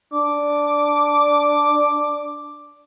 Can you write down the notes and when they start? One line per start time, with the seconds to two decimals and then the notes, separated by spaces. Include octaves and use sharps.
0.13 D4 D6